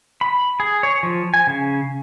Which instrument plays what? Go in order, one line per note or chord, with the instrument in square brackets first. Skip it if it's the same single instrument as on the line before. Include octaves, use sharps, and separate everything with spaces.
[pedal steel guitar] B5
G#4
C#5
F3
G#5
C#3